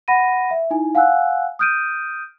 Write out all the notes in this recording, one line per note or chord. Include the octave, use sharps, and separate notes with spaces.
F#5 B5 A#6 D#7
E5
D#4 E4 G#5
F5 F#5 G#5 E6 F#6
D#6 F6 G6 D7 D#7